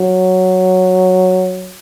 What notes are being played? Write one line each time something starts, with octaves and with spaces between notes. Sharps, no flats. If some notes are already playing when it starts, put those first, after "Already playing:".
Already playing: F#3